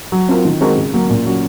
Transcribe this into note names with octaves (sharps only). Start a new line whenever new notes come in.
F#3
C4 F4 A#4
D#3
G#3 C4 F#4 A#4
C#3
F#3 A#3
A#2
F#3 C#4 F#4